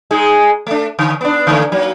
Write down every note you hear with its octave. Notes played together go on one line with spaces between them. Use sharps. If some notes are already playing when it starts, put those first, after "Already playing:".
G#3 D#4 G#4
A3 D4
D3
B3 D4
D3 A3 A#3
F#3 A#3